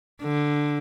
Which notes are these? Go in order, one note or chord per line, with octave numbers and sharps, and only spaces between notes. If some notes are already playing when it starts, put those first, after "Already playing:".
D3